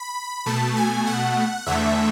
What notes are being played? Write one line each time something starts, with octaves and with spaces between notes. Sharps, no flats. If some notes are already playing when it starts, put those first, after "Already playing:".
Already playing: B5
B2 A3 A5
G#5
F#5
E2 D3 A3 E5